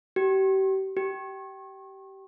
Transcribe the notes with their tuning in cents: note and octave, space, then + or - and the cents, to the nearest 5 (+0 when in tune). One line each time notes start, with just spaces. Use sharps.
G4 -35
G4 -20